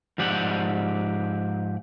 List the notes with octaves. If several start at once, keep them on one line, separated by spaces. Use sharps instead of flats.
G#2 F3 G4 D5 F#5 G5